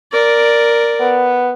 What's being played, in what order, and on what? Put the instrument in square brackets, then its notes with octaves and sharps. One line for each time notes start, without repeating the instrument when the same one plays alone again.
[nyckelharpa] A#4 D5
[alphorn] B3